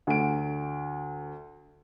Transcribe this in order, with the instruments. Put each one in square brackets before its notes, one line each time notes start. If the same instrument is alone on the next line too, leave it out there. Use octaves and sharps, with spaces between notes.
[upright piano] D2 D7